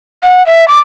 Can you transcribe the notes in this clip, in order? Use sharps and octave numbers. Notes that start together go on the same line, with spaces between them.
F#5
E5
D6